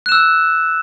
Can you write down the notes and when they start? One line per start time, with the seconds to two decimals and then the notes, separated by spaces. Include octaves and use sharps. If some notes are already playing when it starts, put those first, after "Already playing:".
0.06 F#6
0.09 E7
0.12 E6